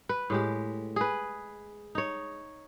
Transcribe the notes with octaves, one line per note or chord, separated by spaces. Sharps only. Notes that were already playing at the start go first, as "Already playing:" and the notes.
B4
A2 G#3 G4
G#4 B4
D#4 C#5